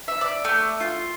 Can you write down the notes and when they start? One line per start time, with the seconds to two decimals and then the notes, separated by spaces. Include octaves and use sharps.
0.08 E5
0.21 D5
0.45 A3
0.80 F4